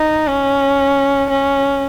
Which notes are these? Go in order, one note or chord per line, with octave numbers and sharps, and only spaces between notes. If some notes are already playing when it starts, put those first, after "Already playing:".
Already playing: D#4
C#4
C#4